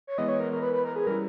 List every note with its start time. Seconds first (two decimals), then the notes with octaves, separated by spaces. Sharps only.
0.07 C#5
0.18 E3 G#3 B3 E4 D#5
0.29 C#5
0.40 A#4
0.51 A#4
0.62 B4
0.73 B4
0.85 A#4
0.96 G#4
1.07 G3 C#4 E4 A#4